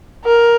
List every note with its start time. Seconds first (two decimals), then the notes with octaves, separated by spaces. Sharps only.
0.25 A#4